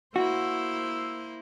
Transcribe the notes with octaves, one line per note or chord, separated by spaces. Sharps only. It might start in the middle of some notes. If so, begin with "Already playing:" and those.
A#3 E4 F#4 C5 E6